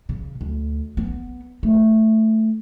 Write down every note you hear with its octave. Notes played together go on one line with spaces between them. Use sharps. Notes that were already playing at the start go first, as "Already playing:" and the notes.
C#3
D2
B3
A3